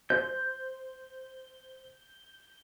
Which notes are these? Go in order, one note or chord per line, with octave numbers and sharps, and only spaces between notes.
C5 G6